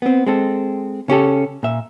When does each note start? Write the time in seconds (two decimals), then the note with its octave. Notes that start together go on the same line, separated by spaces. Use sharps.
0.02 B3 C4
0.26 G#3 C4 A4
1.08 C#3 C#4 G4 A4
1.63 A#2 E5